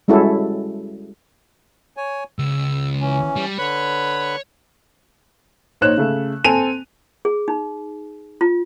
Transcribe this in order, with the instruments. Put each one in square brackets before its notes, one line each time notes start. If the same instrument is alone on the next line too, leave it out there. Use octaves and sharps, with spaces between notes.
[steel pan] G3 G#3 C#4 E4 F#4 A4
[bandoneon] C#5 G#5
[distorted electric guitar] C#2 [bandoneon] E6
[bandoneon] E3 C#4
[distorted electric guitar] G3
[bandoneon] D3 B4 B5 [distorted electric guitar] C#5
[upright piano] A#1 D#4 C5 C#5 F#6 E7
C#3 A3
C4 A4 G#5 D#7 F7
[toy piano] G#4
D#4
F4